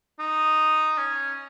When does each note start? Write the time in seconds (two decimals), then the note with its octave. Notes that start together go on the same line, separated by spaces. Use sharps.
0.19 D#4
0.98 C#4